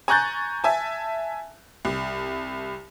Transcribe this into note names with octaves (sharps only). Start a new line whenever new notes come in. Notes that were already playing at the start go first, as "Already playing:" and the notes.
G#5 A#5 C#6 F#6 G6 A6
E5 G#5 A5
C2